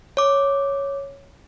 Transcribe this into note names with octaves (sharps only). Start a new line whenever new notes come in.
C#5 D6